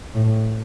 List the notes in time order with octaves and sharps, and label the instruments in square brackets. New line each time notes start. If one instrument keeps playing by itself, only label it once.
[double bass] A2